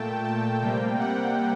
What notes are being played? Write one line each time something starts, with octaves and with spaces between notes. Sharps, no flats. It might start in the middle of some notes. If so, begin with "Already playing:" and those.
Already playing: A#2 A3 G5 A5
A5
C3 G3 A#3 G5
F#5